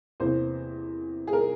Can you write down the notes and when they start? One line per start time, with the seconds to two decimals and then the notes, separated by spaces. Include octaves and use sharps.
0.20 E2 C3 E3 A#3 C5
1.27 G#4
1.33 A#4